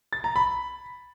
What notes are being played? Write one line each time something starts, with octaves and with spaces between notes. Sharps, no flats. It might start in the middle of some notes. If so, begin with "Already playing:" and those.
A6
A#5
B5